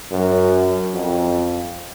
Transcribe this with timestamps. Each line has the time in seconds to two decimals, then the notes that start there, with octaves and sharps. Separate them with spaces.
0.11 F#2
0.95 F2